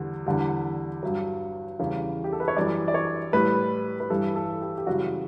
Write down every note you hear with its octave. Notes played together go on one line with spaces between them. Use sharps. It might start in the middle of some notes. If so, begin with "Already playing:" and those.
Already playing: E2 D3 G3
E2 D3 G3
G2 F#3
E2 C#3 E3 G3
G4
A4
B4
C#5
F#2 E3 G3 D5
D5
C#5
A2 G3 B4
B4
G2 E3 G3 A4
A4
G4
G4
F#2 C#3 E3 G3 F#4